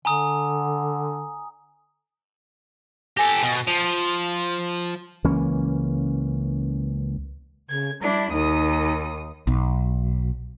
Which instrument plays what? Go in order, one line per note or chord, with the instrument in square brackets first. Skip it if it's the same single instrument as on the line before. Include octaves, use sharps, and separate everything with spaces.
[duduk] D3 [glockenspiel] G#5 A#5 D#6
[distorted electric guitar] G4 A4 [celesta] G#5 A#6
[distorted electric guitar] B2
[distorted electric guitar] F3 [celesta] F7
[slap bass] C#2 E3 A#3 C#4
[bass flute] C#3 [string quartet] G#6
[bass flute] G3 [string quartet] D4 E4
[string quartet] D#2 D#6 [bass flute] D#4
[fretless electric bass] B1